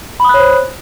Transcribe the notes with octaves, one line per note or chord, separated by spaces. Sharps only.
C5 C#5 B5 D#6 F#6